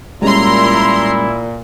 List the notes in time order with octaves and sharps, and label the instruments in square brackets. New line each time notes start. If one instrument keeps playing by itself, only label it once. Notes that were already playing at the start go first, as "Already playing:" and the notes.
[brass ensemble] A#2 [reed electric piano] G3 G#3 C#4 [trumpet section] E4 [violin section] A#5 C6